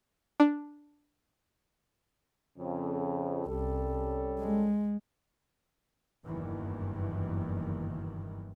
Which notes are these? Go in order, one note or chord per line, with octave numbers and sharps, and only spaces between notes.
D4
F2 C#3
C2 G3 C#4 A4
G#3
F#1 E2 G2 D#3 E3